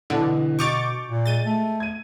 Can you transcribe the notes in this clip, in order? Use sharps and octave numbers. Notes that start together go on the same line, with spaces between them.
B1 B2 D3 E3
B2 C#6 D6 G6 A6 F7
A#2
G#3 A6 D#7 G7
A3
G#6 D#7